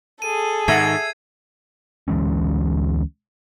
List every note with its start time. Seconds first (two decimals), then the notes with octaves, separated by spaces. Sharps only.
0.22 G#4 A4 D#7
0.68 G#2 D#3 E5 F#5 G#6 C7 D#7
2.08 D2 E3 G#3 C#4